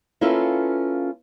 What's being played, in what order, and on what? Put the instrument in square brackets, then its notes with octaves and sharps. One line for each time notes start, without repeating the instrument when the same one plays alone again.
[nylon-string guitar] A#3 C#4 E4 F4 A4 B4